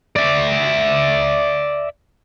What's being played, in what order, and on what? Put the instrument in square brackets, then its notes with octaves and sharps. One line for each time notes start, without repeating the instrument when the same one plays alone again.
[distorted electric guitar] D5 E5